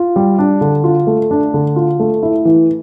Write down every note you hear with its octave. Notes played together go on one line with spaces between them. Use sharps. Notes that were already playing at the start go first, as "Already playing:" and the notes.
Already playing: F4
G3
D4
D3
F4
A3
D4
D3
F4
A3
E4
E3